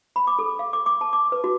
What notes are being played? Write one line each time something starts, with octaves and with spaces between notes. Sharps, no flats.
B5
D6
A4
F5
D6
D6
A5
D6
B4
F#4